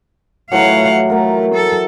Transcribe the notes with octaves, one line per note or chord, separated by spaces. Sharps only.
A2 E3 F#3 F5 F#5
A3 A#4 F#5
A4